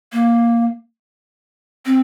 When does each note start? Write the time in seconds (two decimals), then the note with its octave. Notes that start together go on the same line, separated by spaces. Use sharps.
0.13 A#3
1.86 C4